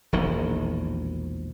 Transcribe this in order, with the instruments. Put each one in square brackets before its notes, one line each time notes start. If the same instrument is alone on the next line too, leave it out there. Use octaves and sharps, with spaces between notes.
[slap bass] E1 A#1 D#3